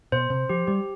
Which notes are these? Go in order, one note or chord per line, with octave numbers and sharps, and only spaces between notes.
B2 C5
C3 C5
F3 G4
G3 G4